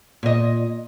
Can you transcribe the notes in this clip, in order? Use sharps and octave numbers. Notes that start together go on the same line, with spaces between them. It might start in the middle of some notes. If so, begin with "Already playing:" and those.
A#2 D#5